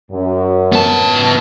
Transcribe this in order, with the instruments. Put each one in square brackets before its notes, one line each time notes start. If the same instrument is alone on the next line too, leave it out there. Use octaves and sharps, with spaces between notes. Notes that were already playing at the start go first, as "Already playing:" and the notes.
[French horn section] F#2
[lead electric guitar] B3 A5